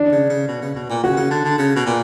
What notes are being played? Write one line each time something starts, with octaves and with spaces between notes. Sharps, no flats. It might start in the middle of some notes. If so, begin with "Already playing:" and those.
Already playing: D4
C#3
C#3
B2
C#3
B2
A#2
C#3 F#4
C#3
D3
D3
C#3
B2
A#2